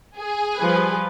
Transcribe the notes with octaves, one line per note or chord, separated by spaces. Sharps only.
G#4
F3 G3 B4